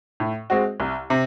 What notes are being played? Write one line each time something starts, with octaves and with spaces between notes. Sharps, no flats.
A2
G#3 C4 F#4
C2
C3